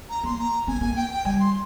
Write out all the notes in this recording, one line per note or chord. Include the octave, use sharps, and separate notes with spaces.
A#5
A#3 C6
A#5
C4 G#5
A#3 G#5
G5
G5
G3 G#5
C6